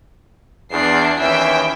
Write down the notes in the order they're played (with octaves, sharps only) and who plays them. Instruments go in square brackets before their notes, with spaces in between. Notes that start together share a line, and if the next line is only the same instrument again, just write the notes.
[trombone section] E2 [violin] D4 C7
[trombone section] D#2 E3 C#4 [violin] E5 G5